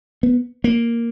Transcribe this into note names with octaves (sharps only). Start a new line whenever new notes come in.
B3
A#3